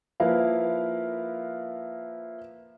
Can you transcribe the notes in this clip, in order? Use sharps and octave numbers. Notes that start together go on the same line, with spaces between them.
F3 A#3 E4 A#4 B4 F5